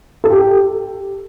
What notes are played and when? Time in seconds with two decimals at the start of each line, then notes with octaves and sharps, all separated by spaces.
0.24 A4
0.30 G4